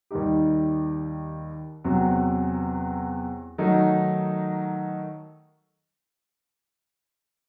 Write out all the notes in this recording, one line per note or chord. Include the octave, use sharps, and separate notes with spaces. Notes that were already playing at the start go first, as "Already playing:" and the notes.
D#2 D#3 G3 D#4 G4
E2 C3 F#3
D#3 F#3 A3 D#4